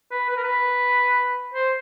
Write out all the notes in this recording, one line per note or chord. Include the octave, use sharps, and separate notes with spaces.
B4
B4
A#4
B4
C5